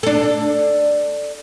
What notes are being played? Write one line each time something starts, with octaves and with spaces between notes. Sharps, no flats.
D4 A4